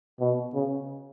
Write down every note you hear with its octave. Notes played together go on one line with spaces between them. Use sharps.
B2
C#3